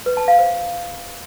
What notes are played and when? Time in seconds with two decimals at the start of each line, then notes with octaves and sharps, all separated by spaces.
0.06 B4
0.17 A5
0.28 F5
0.39 C5